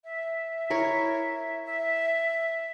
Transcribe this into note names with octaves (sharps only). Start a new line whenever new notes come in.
E5
E4 A#4 C#5
E5